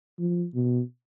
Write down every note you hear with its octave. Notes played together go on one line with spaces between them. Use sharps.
F3
B2